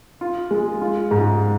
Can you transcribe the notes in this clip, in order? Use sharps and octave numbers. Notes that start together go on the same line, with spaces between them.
F4
G#3
F4
G#2